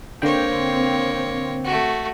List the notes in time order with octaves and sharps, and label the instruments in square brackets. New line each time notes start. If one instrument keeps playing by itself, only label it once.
[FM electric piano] D3 G5 [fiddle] A#3 C#5 [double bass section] C4
[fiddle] A3 F#4